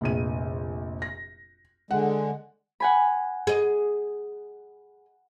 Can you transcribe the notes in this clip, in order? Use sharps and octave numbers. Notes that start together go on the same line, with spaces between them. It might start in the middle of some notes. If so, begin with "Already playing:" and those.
F1 A#1 D#7
A#6
D3 G#3 F#5
F#5 G#5 B5
G#4 D#5